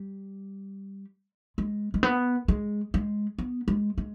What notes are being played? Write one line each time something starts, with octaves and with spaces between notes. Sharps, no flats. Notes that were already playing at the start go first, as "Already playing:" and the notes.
Already playing: G3
G#3
G#3
B3
G#3
G#3
B3
G#3
G#3